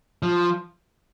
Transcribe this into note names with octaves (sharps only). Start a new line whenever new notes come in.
F3